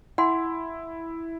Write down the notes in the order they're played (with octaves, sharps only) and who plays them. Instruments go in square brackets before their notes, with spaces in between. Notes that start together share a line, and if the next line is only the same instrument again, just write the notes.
[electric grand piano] E4 [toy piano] F#5 G#5 C6